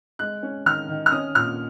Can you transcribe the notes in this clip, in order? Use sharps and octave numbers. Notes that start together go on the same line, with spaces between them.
G#3 F#6
C#4
D#3 F6
D#3
F6
C#4 D#6
A#2 F6